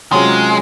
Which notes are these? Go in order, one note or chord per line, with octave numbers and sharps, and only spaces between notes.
C3 F#3 G#3 C#4 F4 G#4